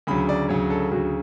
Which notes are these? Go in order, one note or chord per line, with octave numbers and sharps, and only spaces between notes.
D2 C#3 F#3 B5
D5
D2 C#3 F#3 C#5
A4
D2 C#3 F#3 F#4